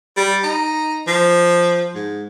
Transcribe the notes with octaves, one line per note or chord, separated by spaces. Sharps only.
G3
D#4
F3
G#2